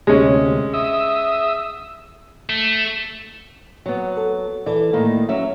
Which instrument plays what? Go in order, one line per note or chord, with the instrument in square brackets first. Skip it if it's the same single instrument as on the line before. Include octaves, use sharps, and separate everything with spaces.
[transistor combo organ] D2 C3 [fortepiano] G#3 C#4
[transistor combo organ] E5 D#6 E6
[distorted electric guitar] A3
[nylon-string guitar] F#3 B3
[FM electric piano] A4
[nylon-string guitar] E3 [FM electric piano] A4 D5
[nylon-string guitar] A2 D#3 A#3
F#3 C#4 E5